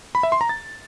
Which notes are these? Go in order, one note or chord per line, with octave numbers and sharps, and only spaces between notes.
B5
E5
C6
A#5
A6